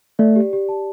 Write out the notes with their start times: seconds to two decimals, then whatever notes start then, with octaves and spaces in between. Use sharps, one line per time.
0.19 A3 D5
0.36 G4
0.53 G4
0.69 A5